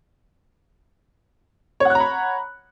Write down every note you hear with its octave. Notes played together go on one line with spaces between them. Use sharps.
C#5 F#5 A#5 B5 F#6